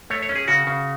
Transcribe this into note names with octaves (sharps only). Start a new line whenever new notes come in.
A3 C#5
C#5
C#4
G#4
C#3 F#4
C#3